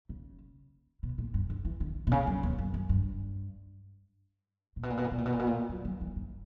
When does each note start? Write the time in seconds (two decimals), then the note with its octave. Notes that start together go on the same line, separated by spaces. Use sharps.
0.09 C#3
1.03 B2
1.18 A#2
1.34 G2
1.50 D3
1.65 E3
1.80 D3
2.07 B2
2.12 C#3
2.27 F#2
2.43 E2
2.58 F#2
2.74 F#2
2.89 G2
4.76 A#2
4.83 B2
4.90 A#2
4.97 B2
5.04 A#2
5.11 B2
5.18 A#2
5.26 B2
5.32 A#2
5.39 B2
5.47 A#2
5.69 F#3
5.85 F#3
6.01 E3
6.16 G2